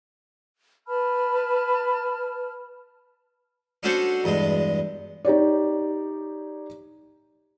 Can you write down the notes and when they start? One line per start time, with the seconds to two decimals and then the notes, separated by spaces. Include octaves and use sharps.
0.87 B4 A5 B5 F6
3.83 C#4 D4 F#4 A4 C5 C#5
4.24 E2 G2 G#3
5.25 D#4 G4 C#5 D5